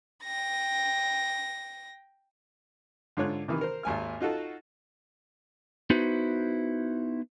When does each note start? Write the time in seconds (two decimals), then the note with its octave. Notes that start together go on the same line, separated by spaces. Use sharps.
0.24 G5 A#6
3.17 G#2 D3 F4 C#5 F#6
3.48 C3 D#3 E3
3.61 A#4 C5
3.83 G#1 D#2 G#5 F6
4.20 D#4 F4 F#4 A4
5.90 B3 D#4 E4 F#4 B4 C5